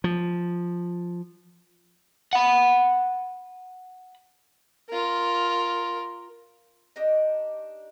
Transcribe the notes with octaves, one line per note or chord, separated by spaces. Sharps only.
F3
F#5 B5
F4 A#4
D4 D#4 G4 D#5